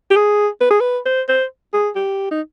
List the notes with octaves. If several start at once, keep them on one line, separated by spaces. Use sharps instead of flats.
G4
G#4
B4
G#4
B4
C5
C5
G#4
G4
D#4